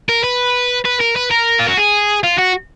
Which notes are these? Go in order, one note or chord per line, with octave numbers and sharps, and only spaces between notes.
A#4
B4
B4
A#4
B4
A#4
F4
F#4
G#4
F4
F#4